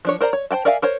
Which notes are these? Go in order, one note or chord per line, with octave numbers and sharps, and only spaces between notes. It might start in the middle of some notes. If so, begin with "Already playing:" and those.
F3 D4 C#5
A#4 C5 D5 A#5
C#5
C5 D5 G5 A5
A#4 D5 E5 F5 G#5
A#4 C5 C#5